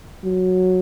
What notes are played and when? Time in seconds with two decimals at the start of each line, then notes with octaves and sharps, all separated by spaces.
0.24 F#3